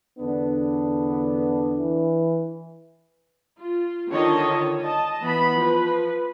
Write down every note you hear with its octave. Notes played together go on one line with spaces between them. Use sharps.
E2 D3 B3 D4
E3
F4
D3 D#3 F4 C#5 D#5 A5
D#5 A5
E3 B3 B5
F3 B4